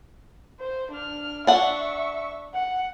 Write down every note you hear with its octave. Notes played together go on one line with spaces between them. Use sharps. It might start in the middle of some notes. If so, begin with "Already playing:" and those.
C5
D4 F6
D4 E5 F#5 C#6
F#5